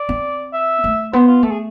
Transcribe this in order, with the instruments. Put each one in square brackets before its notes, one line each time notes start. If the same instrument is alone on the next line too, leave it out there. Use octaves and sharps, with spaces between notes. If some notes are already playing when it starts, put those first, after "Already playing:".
Already playing: [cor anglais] D5
[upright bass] C4
[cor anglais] E5
[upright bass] A3
[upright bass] B3 [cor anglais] C5
[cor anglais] F4
[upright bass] A3 [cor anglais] A4
[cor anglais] G#4